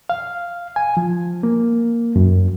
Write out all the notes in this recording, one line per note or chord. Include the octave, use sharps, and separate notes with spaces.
F5
G#5
F3
A#3
F#2